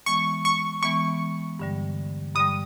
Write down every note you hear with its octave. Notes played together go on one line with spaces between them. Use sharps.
E3 G#3 B3 C#6
C#6
E3 G#3 B3 C#6
G2 D3 G3
G2 D3 G3 D#6